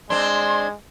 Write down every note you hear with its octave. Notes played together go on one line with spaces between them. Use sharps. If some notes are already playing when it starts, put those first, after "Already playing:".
G#3 C4 D4 C6 G#6